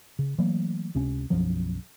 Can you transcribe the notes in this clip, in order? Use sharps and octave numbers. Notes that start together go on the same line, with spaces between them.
C#3
E3 F#3 A3 A#3
C#2 C3 C#4 D4
B1 F#2 F3 F#3